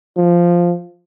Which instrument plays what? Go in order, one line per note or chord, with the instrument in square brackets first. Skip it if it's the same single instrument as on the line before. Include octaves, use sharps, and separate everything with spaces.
[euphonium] F3